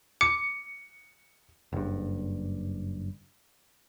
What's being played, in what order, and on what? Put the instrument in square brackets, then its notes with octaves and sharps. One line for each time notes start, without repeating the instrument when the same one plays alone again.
[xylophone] D6 [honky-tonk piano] C#7
[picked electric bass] F#1 G2